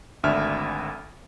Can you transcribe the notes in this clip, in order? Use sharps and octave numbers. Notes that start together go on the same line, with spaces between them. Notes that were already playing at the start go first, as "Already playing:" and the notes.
G#1 D2 D4 E5 F6